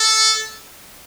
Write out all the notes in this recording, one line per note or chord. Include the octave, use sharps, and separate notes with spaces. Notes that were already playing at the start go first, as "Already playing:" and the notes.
Already playing: A4